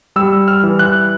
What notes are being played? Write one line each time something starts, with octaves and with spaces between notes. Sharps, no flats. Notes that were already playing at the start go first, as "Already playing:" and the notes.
G3 E6
F6
E3
F#6